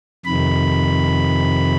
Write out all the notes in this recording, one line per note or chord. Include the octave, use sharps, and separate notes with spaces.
F2 C3 D#3 B5